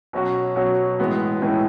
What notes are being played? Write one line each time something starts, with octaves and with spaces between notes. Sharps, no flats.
B2 F#3 C#4 F#4
B2 F#3 C#4 F#4
A2 E3 G#3 B3
A2 E3 G#3 B3